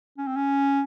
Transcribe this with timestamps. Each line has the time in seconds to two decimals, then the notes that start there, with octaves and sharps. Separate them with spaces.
0.18 C#4
0.27 C4
0.36 C#4